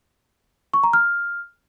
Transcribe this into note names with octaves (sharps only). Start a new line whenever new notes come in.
C#6
A#5
F6